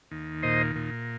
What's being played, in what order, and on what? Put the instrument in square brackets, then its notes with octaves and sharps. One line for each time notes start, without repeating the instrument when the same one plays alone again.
[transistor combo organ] D#2
A#2 C5 D#5
A#2